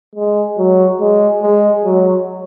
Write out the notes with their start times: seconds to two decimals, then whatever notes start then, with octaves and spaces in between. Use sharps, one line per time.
0.15 G#3
0.58 F#3
1.00 G#3
1.42 G#3
1.85 F#3